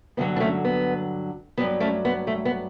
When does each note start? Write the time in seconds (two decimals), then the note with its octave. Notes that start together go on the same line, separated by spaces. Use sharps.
0.17 G2 D3 F#3 B3
0.36 D4
0.40 A3 C#4
0.65 B3
1.57 G2 F#3 B3
1.80 A3 C#4
2.05 B3
2.27 A3
2.45 B3